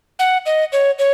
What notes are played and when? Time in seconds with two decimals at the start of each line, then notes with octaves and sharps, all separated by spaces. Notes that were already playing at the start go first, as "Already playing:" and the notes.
0.19 F#5
0.46 D#5
0.73 C#5
0.99 C#5